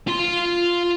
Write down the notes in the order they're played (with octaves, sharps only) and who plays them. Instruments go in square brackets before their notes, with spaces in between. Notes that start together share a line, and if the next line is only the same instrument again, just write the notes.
[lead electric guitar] F4 C6